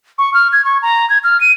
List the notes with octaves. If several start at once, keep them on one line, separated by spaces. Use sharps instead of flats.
C#6
F6
G#6
C#6
A#5
G#6
F6
D#7